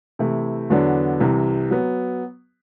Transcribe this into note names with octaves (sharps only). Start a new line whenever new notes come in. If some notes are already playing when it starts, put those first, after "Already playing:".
C3 E3 A3 E4
E2 D3 F#3 B3 D4
C2 C3 E3
F#3 B3